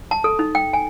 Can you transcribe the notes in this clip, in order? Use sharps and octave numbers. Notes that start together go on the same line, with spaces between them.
A5
A4
D#4
G5
G#5